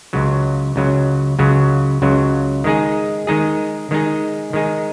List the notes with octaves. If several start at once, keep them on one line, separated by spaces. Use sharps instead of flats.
C#2 C#3 F#3
C#2 C#3 F#3
C#2 C#3 F#3
C#2 C#3 F#3
D#3 G#3 D#4 G#4
D#3 G#3 D#4 G#4
D#3 G#3 D#4 G#4
D#3 G#3 D#4 G#4